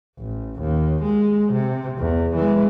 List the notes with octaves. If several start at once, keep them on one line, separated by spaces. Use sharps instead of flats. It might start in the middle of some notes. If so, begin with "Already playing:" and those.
A1
D#2
G#3
C3
E2
E3 G#3